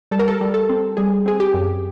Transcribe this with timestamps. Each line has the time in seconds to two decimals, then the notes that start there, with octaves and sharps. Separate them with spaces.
0.11 G3 A4
0.19 A#4
0.28 A4
0.41 G3
0.54 A4
0.69 C4
0.97 G3 G#4
1.26 C4 G#4
1.40 G4
1.54 F#2